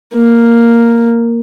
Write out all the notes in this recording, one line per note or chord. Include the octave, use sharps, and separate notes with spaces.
A#3